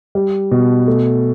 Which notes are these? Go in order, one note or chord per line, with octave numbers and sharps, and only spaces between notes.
G3
B2
A3